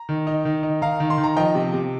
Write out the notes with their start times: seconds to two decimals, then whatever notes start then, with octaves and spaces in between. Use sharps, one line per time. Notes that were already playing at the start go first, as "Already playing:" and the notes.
Already playing: A#5
0.09 D#3
0.27 D#4
0.45 D#3
0.63 D#4
0.82 D#3 F5 A#5
1.00 D#3
1.10 C6
1.18 D#3
1.24 A#5
1.37 F3 D#5 G5
1.55 C3
1.73 C3